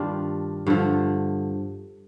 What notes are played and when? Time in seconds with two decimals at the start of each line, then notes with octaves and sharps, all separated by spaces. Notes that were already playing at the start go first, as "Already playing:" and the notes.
Already playing: G2 D#3 G3 D4 F4
0.67 G2 D3 F3